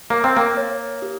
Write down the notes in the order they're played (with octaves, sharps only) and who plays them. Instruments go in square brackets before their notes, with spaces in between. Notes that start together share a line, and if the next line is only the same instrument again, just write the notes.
[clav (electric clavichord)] A#3 [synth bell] C#5
[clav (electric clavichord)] C4
A#3
[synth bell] C#5
G4